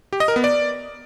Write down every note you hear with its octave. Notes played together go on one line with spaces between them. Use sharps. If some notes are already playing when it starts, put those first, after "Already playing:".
G4
D#5
A#4
B3
D5